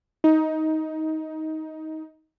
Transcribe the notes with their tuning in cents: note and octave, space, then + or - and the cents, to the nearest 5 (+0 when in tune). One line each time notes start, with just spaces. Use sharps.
D#4 +15